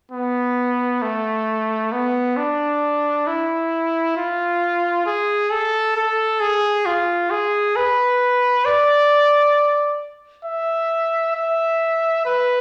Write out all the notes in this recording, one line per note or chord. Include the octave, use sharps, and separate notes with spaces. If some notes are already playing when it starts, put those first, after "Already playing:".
B3
A3
B3
D4
E4
F4
G#4
A4
A4
G#4
F4
G#4
B4
D5
E5
E5
B4